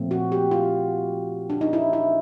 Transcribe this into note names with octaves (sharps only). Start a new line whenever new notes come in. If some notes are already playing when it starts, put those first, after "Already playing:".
Already playing: A#2 F3 A3 C4
F#4
G4
F4
D4
D#4
E4
E4